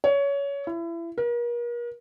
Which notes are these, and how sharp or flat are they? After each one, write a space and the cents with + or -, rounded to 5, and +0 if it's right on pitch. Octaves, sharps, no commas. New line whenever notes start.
C#5 +20
E4 +30
A#4 +40